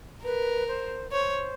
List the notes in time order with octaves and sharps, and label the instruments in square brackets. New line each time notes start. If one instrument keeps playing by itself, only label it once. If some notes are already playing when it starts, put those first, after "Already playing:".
[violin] A#4 [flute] B4
[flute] C5
[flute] C5 [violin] C#5